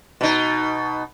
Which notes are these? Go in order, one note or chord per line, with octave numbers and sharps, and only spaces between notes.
B2 D#4